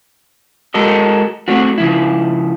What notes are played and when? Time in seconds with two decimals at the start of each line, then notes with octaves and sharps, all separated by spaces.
0.74 G#3 F#4 A4 A#4 D#5
1.48 A3 C4 F#4
1.78 C#3 F3 E4